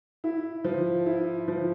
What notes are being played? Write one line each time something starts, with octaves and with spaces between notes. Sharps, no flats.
E4
F3
E4
F3